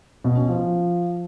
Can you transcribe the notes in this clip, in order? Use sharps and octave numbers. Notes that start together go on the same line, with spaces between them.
B2
C#4
F3